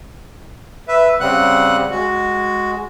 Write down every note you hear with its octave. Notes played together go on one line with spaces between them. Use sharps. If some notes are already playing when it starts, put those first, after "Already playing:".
B4 E5
C#3 G3 C4 F#5 F#6
G#3 F#4